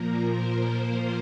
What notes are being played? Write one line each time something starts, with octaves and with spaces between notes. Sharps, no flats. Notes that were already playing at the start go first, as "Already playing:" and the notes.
Already playing: A#2 F3 A#3 A#4
C5